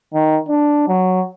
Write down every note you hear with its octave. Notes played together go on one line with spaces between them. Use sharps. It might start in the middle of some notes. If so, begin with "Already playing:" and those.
D#3
D4
F#3